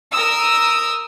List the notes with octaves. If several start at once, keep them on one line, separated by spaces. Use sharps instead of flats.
A#4 D#6 E6